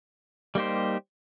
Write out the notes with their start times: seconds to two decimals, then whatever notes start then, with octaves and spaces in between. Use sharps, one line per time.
0.55 G3 A#3 D#4 G4 C5